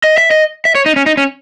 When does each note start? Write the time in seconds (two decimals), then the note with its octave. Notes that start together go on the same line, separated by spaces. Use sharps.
0.04 D#5
0.18 E5
0.31 D#5
0.65 E5
0.75 C#5
0.86 D#4
0.96 C#4
1.06 D#4
1.17 C#4